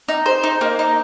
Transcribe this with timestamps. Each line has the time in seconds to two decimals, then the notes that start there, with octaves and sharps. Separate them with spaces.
0.09 D#4
0.26 C5
0.43 D#4
0.61 A#3
0.79 D#4